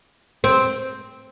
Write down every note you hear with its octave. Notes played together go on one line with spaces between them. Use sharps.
C4